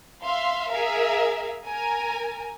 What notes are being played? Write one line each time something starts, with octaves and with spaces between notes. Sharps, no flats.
E5 F5 C6
G#4 A#4 E5 F5
A#4 G#5 A#5